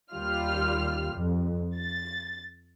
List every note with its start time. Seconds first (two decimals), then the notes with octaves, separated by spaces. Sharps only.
0.12 D#2 G3 F4 F6
1.14 F2
1.76 A6